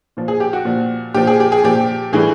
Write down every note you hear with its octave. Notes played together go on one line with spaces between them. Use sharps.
A#2 F3
G#4
G4
F#4
A#2 F3
A#2 F3 G4
G#4
G4
G#4
A#2 F3 G4
A2 E3 G3 G#4